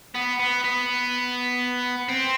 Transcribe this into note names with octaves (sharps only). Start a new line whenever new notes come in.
B3
B3
B3
C4